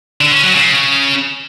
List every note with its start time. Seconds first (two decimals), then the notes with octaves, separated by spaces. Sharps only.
0.21 D3
0.32 C#4
0.43 F#3
0.54 C#3